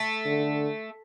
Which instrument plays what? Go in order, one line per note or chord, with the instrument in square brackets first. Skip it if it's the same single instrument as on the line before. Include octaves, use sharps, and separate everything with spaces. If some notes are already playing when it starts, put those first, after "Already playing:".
Already playing: [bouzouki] A3
[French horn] D3